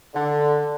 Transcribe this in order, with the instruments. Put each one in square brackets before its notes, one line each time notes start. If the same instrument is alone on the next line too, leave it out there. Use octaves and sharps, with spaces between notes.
[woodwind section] D3